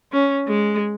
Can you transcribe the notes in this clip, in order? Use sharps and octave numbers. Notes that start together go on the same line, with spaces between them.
C#4
G#3